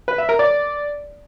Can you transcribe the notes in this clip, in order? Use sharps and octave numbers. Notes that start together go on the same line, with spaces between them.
B4
E5
A#4
D5